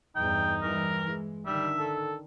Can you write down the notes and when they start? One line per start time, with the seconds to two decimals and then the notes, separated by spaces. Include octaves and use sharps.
0.16 E2 G2 D#4 G5
0.62 E3 G3 A#4
1.08 G#3
1.46 D3 D#3 G3 E5
1.79 A4